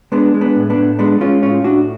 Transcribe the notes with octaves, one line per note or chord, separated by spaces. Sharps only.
G#3 B3 D4
G#3
B3 D4
A2
B3 D4
A2
G#3 B3 D4
G#3 C#4 F4
A2 C#4 F4
A2 D4 F#4